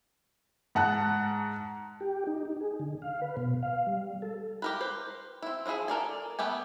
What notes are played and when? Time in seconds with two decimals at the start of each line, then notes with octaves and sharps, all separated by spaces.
0.75 G#2 F#5 A5 F#6
2.00 G4
2.27 D#4
2.45 D#4
2.61 G#4
2.80 D3
3.02 F5
3.22 B4
3.37 B2
3.63 F5
3.87 G3
4.22 A4
4.62 G4 A#4 B4
4.81 B4 C5
5.42 C4 E4
5.66 F3 D4 E4 G#4 E5
5.88 A4 A#4 D5 G#5
6.39 G3 A3 B3 G4 G#5